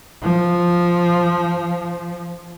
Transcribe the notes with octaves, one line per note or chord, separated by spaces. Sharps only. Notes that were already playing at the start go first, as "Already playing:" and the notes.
F3